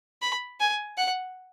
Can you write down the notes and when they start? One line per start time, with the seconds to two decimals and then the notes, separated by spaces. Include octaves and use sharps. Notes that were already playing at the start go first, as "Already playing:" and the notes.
0.22 B5
0.60 G#5
0.97 F#5